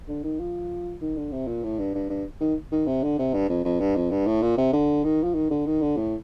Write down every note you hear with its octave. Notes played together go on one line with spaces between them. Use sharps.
D3
D#3
F3
D#3
D3
C3
A#2
A2
G2
G2
G2
D#3
D#3
C3
D3
C3
G2
F2
F2
G2
F2
G2
A2
A#2
C3
D3
D#3
F3
D#3
D3
D#3
D3
A2